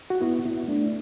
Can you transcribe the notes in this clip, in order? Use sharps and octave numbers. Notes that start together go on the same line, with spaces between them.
F#4
B3 E4
B3 E4
A3 D4